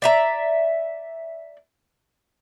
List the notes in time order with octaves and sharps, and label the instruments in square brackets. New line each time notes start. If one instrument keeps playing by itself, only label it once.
[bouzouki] D5 E5 A#5